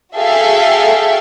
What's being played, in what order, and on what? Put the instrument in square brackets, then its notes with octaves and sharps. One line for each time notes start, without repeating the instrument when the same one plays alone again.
[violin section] F#4 G#4 A4 E5 F5 G5